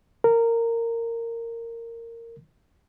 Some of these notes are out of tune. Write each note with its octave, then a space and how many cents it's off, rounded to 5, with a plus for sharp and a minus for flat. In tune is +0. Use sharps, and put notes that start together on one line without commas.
A#4 -15